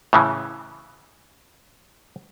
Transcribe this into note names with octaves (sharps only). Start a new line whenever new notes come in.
A2 C#3 E3